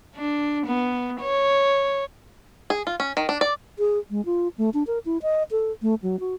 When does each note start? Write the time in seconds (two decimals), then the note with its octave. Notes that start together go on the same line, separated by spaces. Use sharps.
0.16 D4
0.66 B3
1.21 C#5
2.70 G#4
2.87 F4
3.00 C#4
3.17 D#3
3.29 D4
3.41 D5
3.79 G#4
4.10 G#3
4.25 F4
4.58 A3
4.74 D4
4.87 A#4
5.06 E4
5.22 D#5
5.51 A4
5.82 A3
6.02 F#3
6.20 F#4